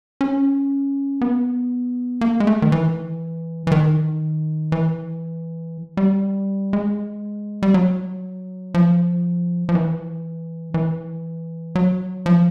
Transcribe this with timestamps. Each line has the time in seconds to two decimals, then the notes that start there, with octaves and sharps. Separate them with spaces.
0.21 C#4
1.21 B3
2.21 A#3
2.40 G#3
2.47 A3
2.62 D#3
2.72 E3
3.67 E3
3.72 D#3
4.72 E3
5.97 G3
6.73 G#3
7.63 G3
7.74 F#3
8.74 F3
9.69 F3
9.75 E3
10.74 E3
11.75 F#3
12.26 F3